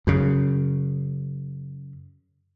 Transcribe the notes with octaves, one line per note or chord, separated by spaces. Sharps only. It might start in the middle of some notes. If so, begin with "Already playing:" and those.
F#2 C#3